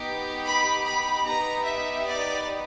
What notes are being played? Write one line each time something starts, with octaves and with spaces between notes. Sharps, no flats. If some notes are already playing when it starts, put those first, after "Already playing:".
Already playing: B3 D#4 G4
B5
B5
B3 D#4 G4 A#5
E5
D5